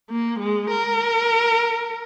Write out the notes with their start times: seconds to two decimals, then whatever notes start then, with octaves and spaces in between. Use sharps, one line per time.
0.10 A#3
0.40 G#3
0.71 A#4